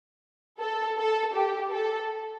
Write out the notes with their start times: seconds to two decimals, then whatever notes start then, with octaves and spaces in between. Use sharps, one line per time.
0.59 A4
0.98 A4
1.34 G4
1.72 A4